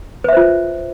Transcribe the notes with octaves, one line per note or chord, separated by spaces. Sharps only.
F4 B4 C5 E5